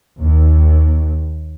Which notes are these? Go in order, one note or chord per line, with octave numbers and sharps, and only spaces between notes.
D#2